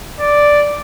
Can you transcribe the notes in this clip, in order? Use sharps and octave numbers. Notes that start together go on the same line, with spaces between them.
D5